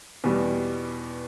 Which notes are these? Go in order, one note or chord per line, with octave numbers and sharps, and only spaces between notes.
E2 B2 G3 B3